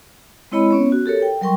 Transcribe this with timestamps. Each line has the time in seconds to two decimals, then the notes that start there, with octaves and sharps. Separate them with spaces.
0.52 G#3 C4 E4 C#5 D#5 B5
0.71 B3 C#4 C#5
0.92 F#4
1.06 G4 A4 A#4 C#5
1.22 G5
1.41 F#3 G3 A#4 G5 C6 C#6